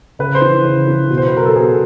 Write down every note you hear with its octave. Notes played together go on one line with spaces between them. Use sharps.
C#3 B4
C5
E3
C#3
E3
B2
C5
B4
F#3 A#4
A4
B2 G#4